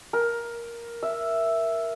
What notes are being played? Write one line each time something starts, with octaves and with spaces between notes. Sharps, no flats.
A#4
E5